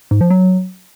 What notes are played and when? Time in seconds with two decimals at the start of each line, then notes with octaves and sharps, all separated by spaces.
0.11 G#2
0.21 F3
0.30 F#3